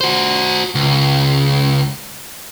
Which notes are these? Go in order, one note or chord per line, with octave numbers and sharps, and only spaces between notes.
F#4 C5
C#2